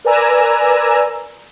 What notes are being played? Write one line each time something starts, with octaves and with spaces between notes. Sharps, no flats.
A#4 B4 D5 G#5 A#5 E6